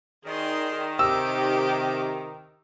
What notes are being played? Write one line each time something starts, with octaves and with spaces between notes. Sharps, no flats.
D#3 G#4 D5 C6
C3 G4 D6 E6